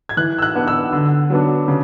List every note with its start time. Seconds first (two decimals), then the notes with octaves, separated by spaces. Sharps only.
0.09 G#6
0.17 E3 F#6
0.38 E6
0.42 F#6
0.55 B3 D4
0.68 E6
0.93 D3
1.30 F#3 B3 D4
1.68 C#3